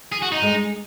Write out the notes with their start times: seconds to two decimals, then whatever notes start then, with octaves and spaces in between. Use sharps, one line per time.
0.12 G#4
0.22 F#4
0.32 D#4
0.42 G#3 G#4